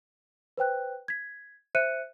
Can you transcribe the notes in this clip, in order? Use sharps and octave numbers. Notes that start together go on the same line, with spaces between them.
B4 C5 G5 F#6
G#6 B6
C5 E5 F#6 C#7 D#7